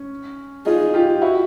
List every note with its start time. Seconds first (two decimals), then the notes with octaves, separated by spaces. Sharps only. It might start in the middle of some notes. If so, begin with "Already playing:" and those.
Already playing: C#4
0.66 D#4 F4 G#4
0.94 F4 G4
1.22 E4 F#4